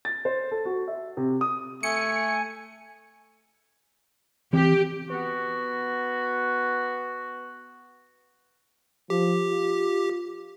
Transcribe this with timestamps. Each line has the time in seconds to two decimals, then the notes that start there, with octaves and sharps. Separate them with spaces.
0.05 A6
0.25 C5
0.51 A4
0.65 F#4
0.88 E5
1.17 C3
1.41 D#6
1.83 A3 G#5 C#7
4.53 E3 C4 G4
5.10 B3 F#4
9.10 F3 G4
9.49 F4